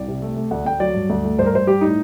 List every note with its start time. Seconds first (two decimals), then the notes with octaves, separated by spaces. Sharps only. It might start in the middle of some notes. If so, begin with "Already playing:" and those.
Already playing: C2 D5
0.08 C3
0.22 A3
0.36 A3
0.51 D2 F#5
0.66 D2 G5
0.80 F#3 D5
0.95 G2
1.09 D2
1.24 A3
1.39 G2 C5
1.46 A#4
1.53 G2 C5
1.67 G3 G4
1.81 A2 D#4